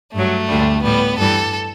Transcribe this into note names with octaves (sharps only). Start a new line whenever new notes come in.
G2 F#3 A3
D2 D3 G3
A2 G3 B3
G2 E3 G3 A4